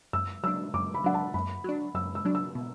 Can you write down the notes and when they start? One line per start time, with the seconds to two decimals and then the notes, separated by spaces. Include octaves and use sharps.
0.13 F#2 E6
0.43 F#3 D4 E6
0.74 F#2 D6
0.94 B5
1.04 F#3 D4 F#5
1.14 A5
1.34 F#2 B5
1.64 F#3 D4
1.94 F#2 E6
2.15 E6
2.25 F#3 D4
2.35 E6
2.55 B2